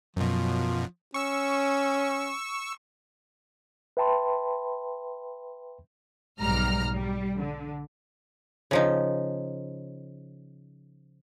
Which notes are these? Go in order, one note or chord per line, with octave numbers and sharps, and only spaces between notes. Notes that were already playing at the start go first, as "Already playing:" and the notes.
F#2 B2 F3
C#4 C#6 E6
B4 E5 G5 A5 B5 C6
B1 G#2 G3 A#5 F6
G3
D3
C#3 F3 D#4